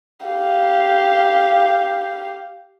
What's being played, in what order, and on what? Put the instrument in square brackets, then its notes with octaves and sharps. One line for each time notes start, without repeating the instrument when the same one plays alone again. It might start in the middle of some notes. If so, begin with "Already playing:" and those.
[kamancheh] G4 F5